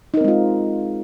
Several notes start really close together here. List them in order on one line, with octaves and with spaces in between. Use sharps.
D#4 A#4 C4 G#3 F4